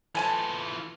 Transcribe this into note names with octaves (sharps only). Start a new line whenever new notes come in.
E3 F4 A4 G#5 A5